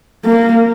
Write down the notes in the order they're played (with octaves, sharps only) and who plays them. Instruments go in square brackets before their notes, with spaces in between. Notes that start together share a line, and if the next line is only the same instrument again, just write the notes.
[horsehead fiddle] A#3